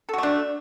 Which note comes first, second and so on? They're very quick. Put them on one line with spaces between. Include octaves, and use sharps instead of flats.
A4 F#4 A3 D4